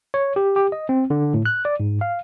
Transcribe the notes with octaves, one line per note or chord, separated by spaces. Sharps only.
C#5
G4
G4
D#5
C4
D3
A2
F#6
D5
G#2
F5